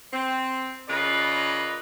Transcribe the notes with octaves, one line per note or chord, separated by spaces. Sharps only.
C4
C#3 F4 A#4 B4 D5 D#5